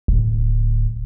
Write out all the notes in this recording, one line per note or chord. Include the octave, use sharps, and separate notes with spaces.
D1